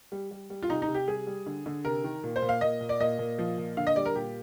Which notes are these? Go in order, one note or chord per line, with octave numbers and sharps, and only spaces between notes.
G3
G3
G3
F4
C3 D#4
D#4
C3
G4
G3 G#4
G3
D3
D3
C3 A#4
D#3
A#2
C5
A#2
F5
A#2 D#5
A#2
D5
A#2 D#5
A#2
F3
A#2
D3 F5
D#5
G3 D5
A#4
A#2 G4